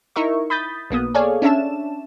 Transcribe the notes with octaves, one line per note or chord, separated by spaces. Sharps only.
D#4 E4 A#4 E5 C#6
B5 D#6 G6 A6 B6
B1 A#3 B3 D#6
G#4 A4 C#5 D5 F5 G#5
C#4 D4 E5 A5 E7